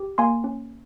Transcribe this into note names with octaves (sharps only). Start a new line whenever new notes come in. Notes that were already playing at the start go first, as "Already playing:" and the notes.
Already playing: G4
A#3 G#5 C6
C#4